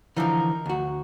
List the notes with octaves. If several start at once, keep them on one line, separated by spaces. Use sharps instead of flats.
D3 E3 F3 D#4 A#4
D2 F#4